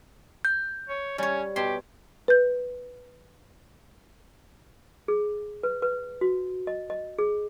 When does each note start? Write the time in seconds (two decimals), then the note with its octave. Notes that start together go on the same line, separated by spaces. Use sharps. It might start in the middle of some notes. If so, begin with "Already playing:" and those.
0.45 G6
0.89 C#5
1.18 G3 C#4 C#5
1.56 B2 G4 C#5 C6
2.28 B4 G6
5.08 G#4
5.63 B4
5.82 B4
6.21 F#4
6.67 D#5
6.90 D#5
7.18 G#4